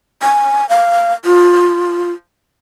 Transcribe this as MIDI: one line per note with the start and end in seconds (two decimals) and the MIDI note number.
0.22 0.68 80
0.69 1.13 77
1.25 2.12 65